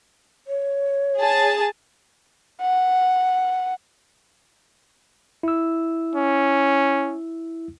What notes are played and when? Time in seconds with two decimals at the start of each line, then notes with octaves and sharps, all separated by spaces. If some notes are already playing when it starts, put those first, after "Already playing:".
0.47 C#5
1.18 G#4 A5
2.61 F#5
5.43 E4 E6
6.16 C#4